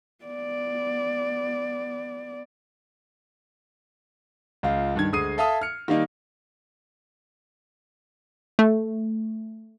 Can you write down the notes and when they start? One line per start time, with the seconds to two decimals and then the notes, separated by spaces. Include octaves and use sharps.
0.25 B3 D5
4.63 C#2 F4
4.95 G2 D#3 G#6
5.12 D2 G#3 D#6 C7 D#7
5.38 A4 E5 F5 D#6
5.61 F6 C#7
5.88 D#3 G3 A#3 D#4
8.59 A3